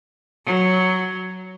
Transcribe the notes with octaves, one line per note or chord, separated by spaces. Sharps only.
F#3